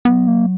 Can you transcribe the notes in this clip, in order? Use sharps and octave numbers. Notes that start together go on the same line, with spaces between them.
F#3 B3
A#3